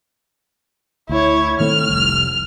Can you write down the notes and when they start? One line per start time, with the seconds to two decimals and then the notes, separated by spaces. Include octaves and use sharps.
1.09 D2 E4 C#5
1.60 D#3 A3 C4 F6
1.89 F1 C2